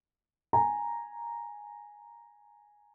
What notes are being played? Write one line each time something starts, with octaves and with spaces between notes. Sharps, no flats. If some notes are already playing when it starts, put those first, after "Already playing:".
G#5 A#5